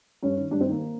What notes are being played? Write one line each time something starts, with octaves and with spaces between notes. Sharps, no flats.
G2 C#4
D#3
G2 D4
C4
D#3 A#3